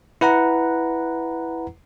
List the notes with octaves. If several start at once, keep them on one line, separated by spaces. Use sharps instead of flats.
E4 B4 F#5 A#5